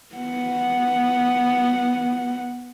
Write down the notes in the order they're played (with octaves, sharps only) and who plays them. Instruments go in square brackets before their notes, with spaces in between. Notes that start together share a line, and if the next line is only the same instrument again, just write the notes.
[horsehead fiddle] B3 F#5